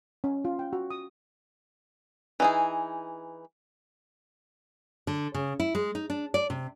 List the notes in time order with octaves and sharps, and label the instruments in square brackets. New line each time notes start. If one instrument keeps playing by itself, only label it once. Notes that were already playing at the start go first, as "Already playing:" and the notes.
[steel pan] C#4
F4
G5
F#4
D#6
[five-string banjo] E3 D#4 G#4
[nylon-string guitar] D3
C#3
E4
G#3
D#4
D4
D5
C3